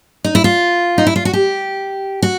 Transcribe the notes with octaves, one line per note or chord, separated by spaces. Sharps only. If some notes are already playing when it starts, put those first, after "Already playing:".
D#4
E4
F4
D#4
E4
F4
F#4
G4
F#4